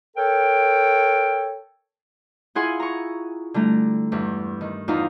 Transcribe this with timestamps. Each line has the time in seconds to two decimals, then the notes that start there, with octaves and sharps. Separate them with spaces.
0.17 A4 A#4 C#5 G5
2.55 E4 F4 G#4 F#5 G#5 C6
2.80 A#5 C#6
3.54 D3 G3 A3 A#5
4.12 E2 G2
4.61 D#3
4.88 E2 D#4 F4 F5 A#5